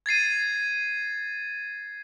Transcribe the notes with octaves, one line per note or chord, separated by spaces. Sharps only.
G#6 A6 C7 D#7